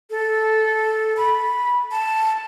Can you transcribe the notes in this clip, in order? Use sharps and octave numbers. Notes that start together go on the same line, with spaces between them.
A4
B5
A5